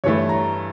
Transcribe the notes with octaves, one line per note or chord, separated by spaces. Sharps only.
G2 E3 A3 C#5
A#5